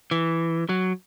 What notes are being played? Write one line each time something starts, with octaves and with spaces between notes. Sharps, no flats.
E3
F#3